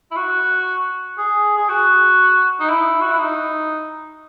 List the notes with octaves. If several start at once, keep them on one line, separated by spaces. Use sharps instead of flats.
E4
F#4
G#4
G#4
F#4
D#4
E4
F#4
E4
D#4